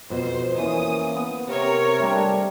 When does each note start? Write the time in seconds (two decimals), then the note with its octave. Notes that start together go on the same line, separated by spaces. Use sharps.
0.10 F2 B2 C5
0.58 E3 A#3 C#4 D#6
1.16 B3
1.47 C3 A#4 C#5
2.00 G3 A3 C4 D4